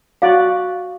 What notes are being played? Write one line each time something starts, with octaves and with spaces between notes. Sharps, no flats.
F#4 D5 F5